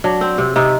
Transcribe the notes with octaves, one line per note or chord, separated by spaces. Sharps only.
F#3 D4
C4
C3
C3 D#4